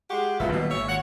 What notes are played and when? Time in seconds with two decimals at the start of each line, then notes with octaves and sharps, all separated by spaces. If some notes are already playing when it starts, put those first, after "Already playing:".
0.10 G#3 F#4 G4
0.40 F#1 C#2 A2 B3 F4 E5
0.52 B2 D#3 G3 A#3
0.70 G#1 A#2 C#5 E5
0.89 C#5 F#5